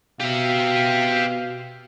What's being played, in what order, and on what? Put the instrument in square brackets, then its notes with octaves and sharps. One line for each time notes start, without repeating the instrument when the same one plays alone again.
[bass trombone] B2 [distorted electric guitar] G4 E5 [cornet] F5